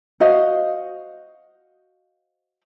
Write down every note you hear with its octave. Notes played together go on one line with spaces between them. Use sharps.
F#4 C5 D#5 F5